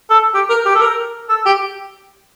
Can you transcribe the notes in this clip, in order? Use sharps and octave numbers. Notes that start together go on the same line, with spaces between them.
A4
G4
A#4
G4
A4
A#4
A4
G4